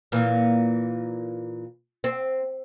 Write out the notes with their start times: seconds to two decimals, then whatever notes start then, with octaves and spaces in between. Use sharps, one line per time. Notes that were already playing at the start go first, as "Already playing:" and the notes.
0.12 A#2 E3
2.04 C4